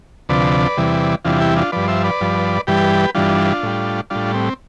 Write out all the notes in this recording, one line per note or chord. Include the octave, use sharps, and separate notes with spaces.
D2 C3 F3 B4 D5
E2 C3 E3 G3
E2 C3 E3 G3 D4 F4
E4 G4
D4 F4
G2 F3 B4 D5
C5 E5
B4 D5
G2 F3
G2 E3 G3 G4 B4
G2 E3 G3 D4 F4
A2 G3
A2 G3 D4 F4
C4